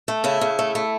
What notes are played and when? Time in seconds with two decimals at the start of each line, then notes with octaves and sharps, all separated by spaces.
0.08 A3
0.24 C#3 E4
0.41 C#3
0.59 A3
0.75 A3